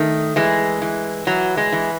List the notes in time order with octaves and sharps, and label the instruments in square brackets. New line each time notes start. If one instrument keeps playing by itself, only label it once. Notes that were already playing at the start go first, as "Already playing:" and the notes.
Already playing: [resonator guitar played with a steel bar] D#3 A3
E3 G#3
E3
E3 F#3
G#3
E3